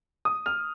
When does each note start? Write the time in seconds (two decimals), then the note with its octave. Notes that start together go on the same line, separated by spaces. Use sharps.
0.25 D#6
0.46 F6